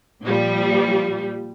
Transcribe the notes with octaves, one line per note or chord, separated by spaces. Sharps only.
A#2 F3 G3